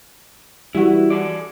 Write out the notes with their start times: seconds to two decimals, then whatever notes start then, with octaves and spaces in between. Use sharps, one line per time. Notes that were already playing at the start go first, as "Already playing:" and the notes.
0.75 E3 G3 E4 F#4
1.10 G#4 A4 D5